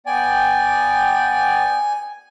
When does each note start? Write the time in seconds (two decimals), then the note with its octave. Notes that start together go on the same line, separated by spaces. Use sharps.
0.07 B3 D5 G5 G#5